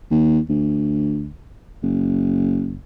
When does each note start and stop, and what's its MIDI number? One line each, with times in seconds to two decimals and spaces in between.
0.11 0.40 39
0.50 1.31 38
1.83 2.80 30